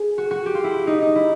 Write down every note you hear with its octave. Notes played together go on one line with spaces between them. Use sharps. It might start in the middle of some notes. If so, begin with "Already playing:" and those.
Already playing: G#4
F#4
F#4
G4
F4
E4
D#4
D#4
E4